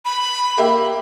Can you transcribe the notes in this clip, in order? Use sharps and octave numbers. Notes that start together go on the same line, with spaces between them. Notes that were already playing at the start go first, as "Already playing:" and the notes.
B5
A#3 G4 E5